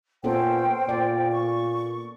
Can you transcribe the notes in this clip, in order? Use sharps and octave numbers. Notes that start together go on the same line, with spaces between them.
A#2 B3 C#4 A4 C5 G5
A#2 D5
C#6